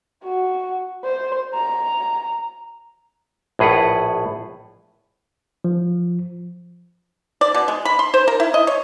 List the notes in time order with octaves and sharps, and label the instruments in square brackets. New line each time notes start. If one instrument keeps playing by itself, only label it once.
[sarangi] F#4
C5
A#5
[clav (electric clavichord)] A#1 A2 G#4 B4 F#5
[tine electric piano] F3
[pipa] D5
B2
G#3
B5
C6
C5
A#4
E4
D#5
C#5